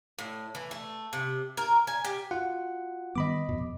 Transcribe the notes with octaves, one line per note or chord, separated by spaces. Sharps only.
A2
E3
A3
C3
A#4
G#5
G4
F4 F#4 F#5
D#3 G3 B3 D#5 B5 D6
F2 B2